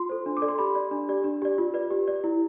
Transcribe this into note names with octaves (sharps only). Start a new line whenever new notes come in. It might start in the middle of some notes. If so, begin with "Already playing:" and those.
Already playing: F4 C6
A4 C5
D4
D6
A4 D5
C6
G4 B5
D5
D4
G4 D5
D4
G4 D5
F4
B4 D5
G4
D5
E4